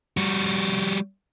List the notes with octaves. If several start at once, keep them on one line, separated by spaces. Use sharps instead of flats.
G3 F#4